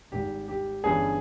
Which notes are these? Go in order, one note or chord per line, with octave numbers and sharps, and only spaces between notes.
G#1 G#2 G3 G4
G4
G1 G2 E3 G3 C#4 G#4